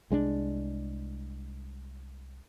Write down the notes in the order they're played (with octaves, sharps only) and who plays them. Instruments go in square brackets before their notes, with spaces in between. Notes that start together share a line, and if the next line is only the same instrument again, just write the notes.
[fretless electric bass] C2 G#3 C#4 D4